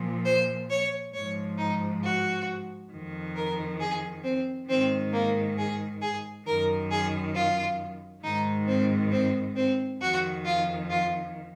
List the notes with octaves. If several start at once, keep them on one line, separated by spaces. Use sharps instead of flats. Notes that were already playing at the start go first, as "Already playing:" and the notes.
Already playing: A#2 F3
C5
C#5
G#2 C#5
F3
D#4
F#4
F2 D#3
A#4
G#4
C4
G#2 D#3 C4
A#3
G#4
G#4
F#2 D#3 A#4
G#4
F4
G#2 D#3 D#4
C4
C4
C4
F2 D#3 F#4
F4
F4